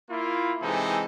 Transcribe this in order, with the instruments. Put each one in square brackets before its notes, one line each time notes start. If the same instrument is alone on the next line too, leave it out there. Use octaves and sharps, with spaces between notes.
[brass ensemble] A#3 E4 F4
C3 E3 G#3 D#4 A4